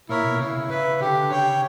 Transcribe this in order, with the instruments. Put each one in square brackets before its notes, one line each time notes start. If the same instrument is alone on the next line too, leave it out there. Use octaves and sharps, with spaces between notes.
[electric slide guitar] A#2 [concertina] E4 A#4 C#5 E5
[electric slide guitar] B2
[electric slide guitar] C#3 [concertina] E4
[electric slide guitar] C#3 [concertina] B4 E5
[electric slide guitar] D3 [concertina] G4
[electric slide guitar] C#3 [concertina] C#5 G5